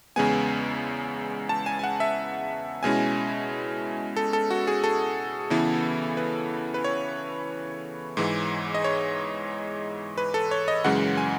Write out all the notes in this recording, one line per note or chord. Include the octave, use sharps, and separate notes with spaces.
E2 C#3 G#3 B3 G#5
A5
G#5
G#5
F#5
E5
B2 G#3 C#4 E4 G#5
A4
A4
F#4
G#4
A4
C#3 E3 B3 E4
B4
B4
C#5
G#2 E3 G#3
D#5
C#5
B4
A4
C#5
D#5
F#2 C#3 E3 G#3 F#5
G#5